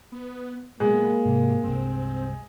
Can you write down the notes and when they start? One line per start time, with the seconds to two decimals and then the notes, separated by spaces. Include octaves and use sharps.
0.12 B3
0.80 A#2 F#3 G#3 A#3 B3
1.25 G#2 C3
1.63 C2 G2 C4